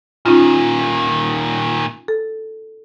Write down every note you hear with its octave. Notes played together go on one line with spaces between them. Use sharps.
A#2 D#3 C#4 D#4 F4
A4